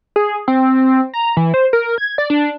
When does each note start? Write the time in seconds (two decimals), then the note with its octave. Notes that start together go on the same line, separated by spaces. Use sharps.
0.16 G#4
0.48 C4
1.14 A#5
1.37 E3
1.54 C5
1.73 A#4
1.98 G#6
2.18 D5
2.30 D4